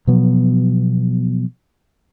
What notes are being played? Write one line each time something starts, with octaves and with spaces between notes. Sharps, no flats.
B2 F3 F#3 B3